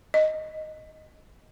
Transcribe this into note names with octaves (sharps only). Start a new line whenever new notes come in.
D#5